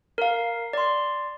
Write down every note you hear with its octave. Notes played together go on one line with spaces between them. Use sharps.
A#4 F5
D5 C6